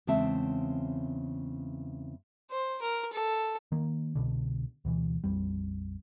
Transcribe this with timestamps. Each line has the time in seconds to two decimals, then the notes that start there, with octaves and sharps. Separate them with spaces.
0.07 E2 C#3 G#3 C4 E5 A5
2.51 C5
2.82 A#4
3.13 A4
3.72 D#3 A#3
4.15 C2 B2 D3
4.85 D2 B2 E3
5.24 A#1 F2 G3